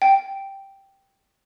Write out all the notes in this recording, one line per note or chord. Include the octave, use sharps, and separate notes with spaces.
G5